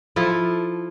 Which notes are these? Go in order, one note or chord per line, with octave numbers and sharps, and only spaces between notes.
F3 E4 A4